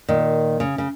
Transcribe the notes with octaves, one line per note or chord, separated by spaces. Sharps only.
A#2 D#3
C#3
C#3